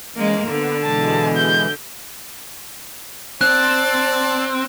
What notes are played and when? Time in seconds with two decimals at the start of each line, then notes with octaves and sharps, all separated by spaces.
0.16 E3 G#3 A#3 C#4
0.47 D3 B3 D4
0.83 B2 E3 G#3 A5
1.37 G6
3.41 C4 D5 A5 F#6